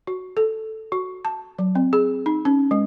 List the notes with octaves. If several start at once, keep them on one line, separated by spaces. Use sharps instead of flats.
F#4
A4
F#4
A5
F#3
C4
G#4
D#4
C#4
G#3